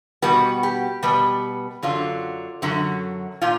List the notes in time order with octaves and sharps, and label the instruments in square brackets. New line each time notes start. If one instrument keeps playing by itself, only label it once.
[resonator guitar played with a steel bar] B2 G3 B3 F#4
G4
B2 G3 B3
F#2 D3 F#3 F4
F#2 D3 F#3
A#2 F4